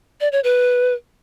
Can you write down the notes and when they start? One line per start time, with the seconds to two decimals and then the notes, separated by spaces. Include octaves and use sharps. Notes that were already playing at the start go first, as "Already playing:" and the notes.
0.21 D5
0.32 C#5
0.44 B4